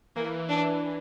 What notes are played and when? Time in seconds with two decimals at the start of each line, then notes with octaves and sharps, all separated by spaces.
0.16 E3 A#3
0.49 D4